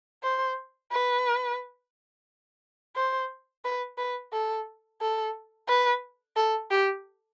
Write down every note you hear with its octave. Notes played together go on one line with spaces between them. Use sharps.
C5
B4
C5
B4
B4
A4
A4
B4
A4
G4